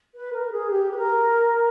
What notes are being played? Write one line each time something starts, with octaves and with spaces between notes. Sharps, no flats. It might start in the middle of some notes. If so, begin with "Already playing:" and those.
B4
A#4
G#4
G4
B4
A#4